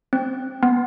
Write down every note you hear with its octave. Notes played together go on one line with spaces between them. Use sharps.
C4
B3